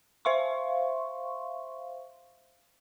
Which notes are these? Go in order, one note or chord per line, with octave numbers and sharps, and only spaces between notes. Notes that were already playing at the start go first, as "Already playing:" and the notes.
C5 E5 F5 C6 C#6